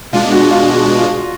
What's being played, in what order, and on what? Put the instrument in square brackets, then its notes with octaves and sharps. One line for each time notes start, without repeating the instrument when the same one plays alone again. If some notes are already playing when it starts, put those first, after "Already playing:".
[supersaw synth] B2 G#3 D4 [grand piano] F4
[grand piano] F#4
F4
F#4
F4